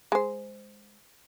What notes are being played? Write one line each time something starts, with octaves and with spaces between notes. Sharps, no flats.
G#3 C5